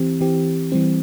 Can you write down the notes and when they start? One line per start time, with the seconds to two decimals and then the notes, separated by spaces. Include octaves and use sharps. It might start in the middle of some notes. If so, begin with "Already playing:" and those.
Already playing: E3 C4 G4
0.21 E3 C4 G4
0.72 E3 G3 C4